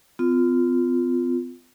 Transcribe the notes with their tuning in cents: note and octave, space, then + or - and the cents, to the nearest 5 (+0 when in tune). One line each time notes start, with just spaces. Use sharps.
C4 -45 F4 +0